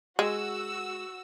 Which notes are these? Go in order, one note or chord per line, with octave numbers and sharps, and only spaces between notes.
G#3 F#4 E6